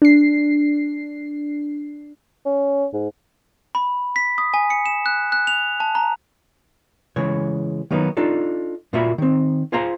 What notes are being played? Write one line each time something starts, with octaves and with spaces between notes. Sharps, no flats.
D4 C7
C#4
G#2
B5
B6
D#6
G#5
C#7
E7
F#6
F#6
F7
A5
A#5
C#3 E3 G#3 C#5
D#3 F#3 A#3 B3 D#4
D4 D#4 F4 A4
A#2 A#3 F4 F#4 E5 B5
D#3 C4
F4 G#4 C5 F5 A#5 C6